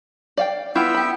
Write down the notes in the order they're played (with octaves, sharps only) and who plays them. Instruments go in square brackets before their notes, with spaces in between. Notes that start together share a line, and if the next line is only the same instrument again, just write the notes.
[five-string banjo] D5 F5 G5
[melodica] B3 E5 G5 [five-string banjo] E4 F4 B4
[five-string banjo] G4 B5